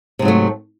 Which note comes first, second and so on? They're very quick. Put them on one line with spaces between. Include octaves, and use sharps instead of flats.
C3 G#2 F#3 A3